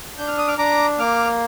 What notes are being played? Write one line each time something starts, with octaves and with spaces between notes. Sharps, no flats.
D4 G6
F6
D#6
D6 F6
D4 A#5 D6
A#3 D6 F6